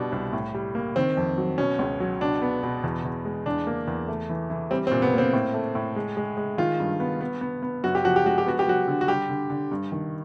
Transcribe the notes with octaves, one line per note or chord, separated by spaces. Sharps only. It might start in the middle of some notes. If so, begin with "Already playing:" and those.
Already playing: B2 G3 D4
C2
A2
G3
A#3
D#3 C4
F2
F#3
B2 C#4
C#2
F#3
B2 D4
B3
B2
E2
E2
G#3
E2 D4
A#3
E2
A3
E3
E3
G3 C4
C4
A#2
B3
A#3 C4
A2
A3
A2
G#3
G#3
G#3
D#3 F4
G2
B3
B3
B3
B3
F#2 F#4
G4
F3 F#4
G4
G#3 F#4
G4
B3 F#4
G4
F#3 F#4
D3
F#4
G3 G4
D3
D3
G2
D#3